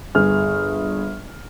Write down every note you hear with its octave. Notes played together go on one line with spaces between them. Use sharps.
G1 G#4 F6